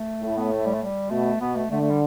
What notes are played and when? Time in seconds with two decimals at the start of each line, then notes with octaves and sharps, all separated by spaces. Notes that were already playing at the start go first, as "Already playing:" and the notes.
Already playing: A3
0.21 A2
0.37 B3
0.51 A3
0.66 G3
0.74 A3
0.83 G3
1.10 B2 A3
1.41 B2 B3
1.56 A3
1.70 D3 A3
1.81 A3
1.90 G3